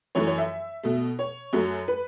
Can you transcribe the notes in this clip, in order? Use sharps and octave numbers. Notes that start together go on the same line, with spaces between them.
F#2 E3 A3 C#5
C#5
E5
B2 A3
C#5
F#2 F#3 A3
B4